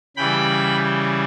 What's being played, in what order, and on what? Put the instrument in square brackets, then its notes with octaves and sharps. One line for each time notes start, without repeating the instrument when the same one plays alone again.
[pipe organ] C#3 E3 G3 G5 B5